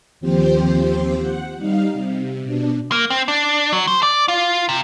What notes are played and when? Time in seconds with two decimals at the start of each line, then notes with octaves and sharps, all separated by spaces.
0.20 D#2 F3 C4 G4 C5
1.19 F#5
1.57 G3 D#4 F5
1.94 C3
2.44 B2 D4
2.92 A#3
3.10 C4
3.28 D4
3.73 F#3
3.87 C5
4.03 D5
4.28 F4
4.69 C3